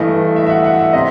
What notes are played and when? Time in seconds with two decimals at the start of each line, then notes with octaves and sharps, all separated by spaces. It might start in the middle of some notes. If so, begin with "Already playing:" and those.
Already playing: G2 E3 A3 D#5
0.36 E5
0.47 E5
0.50 F#5
0.64 F#5
0.79 E5
0.93 C3 D#5